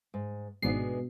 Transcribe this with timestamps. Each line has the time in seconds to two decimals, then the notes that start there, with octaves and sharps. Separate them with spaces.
0.14 G#2
0.62 G#1 B2 G#3 B3 D4 C7